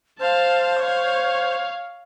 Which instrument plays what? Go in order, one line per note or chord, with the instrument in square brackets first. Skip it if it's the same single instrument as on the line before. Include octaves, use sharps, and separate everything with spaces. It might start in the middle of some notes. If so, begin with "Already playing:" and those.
[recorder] C5 [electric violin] F5 A5
[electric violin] C#5 F5